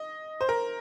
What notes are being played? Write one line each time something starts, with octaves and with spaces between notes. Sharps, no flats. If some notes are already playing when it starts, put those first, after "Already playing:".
Already playing: D#5
C5
A#4